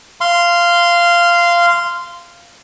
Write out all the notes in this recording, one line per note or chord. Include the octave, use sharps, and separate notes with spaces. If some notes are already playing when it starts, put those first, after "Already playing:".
F5 C6